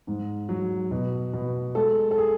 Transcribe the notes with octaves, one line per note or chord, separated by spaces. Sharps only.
G#2
F#3
B2
B2
G#3 A4
A4
G#4